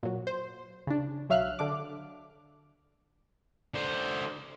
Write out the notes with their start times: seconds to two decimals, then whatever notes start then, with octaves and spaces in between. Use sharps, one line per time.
0.03 A#2 F#3
0.27 C5
0.87 C#3 D4
1.29 B1 F#3 E5 F5 F6 F#6
1.59 D3 D4 D6
3.74 D3 C5